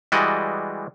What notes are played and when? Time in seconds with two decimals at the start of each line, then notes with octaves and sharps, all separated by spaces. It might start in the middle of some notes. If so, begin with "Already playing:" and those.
0.12 E3 G3 G#3 F#4 D5 D#5